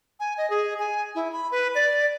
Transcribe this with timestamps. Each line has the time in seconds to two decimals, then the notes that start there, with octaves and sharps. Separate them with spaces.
0.20 G#5
0.38 D#5
0.50 G#4
0.79 G#5
1.15 E4
1.32 B5
1.52 B4
1.75 D5